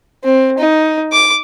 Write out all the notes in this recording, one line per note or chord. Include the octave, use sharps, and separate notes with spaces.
C4
D#4
D6